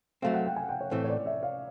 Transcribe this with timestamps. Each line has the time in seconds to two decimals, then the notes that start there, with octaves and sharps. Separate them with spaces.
0.22 F#3 A3 C4 F5
0.33 F#5
0.45 G5
0.56 G#5
0.69 G5
0.81 C#5
0.91 A2 E3 A3 C4 C#5
1.04 C#5
1.09 D5
1.26 E5
1.43 F5